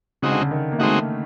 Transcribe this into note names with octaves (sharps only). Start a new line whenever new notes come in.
C#3 G#3 C4 D#4 F#4
D3
C#3
D#3
A#3
G#3 A3 C4 D#4 F#4